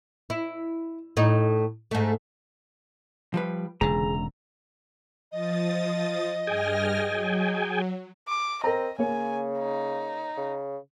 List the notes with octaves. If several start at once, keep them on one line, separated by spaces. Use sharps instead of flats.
E4
A2 D#4
G#2 A3
F3 G3 B4
E1 C#2 D3 G#4 A#5
F3 D#5 D#6 A6
G2 G#4 G5 G#5 F6 A#6
F#3
D6
C4 A#4 D#5 A#5
C#3 A#3 C#5 G#5
D#4
C#3